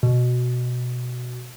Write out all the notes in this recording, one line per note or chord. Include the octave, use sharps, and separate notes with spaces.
B2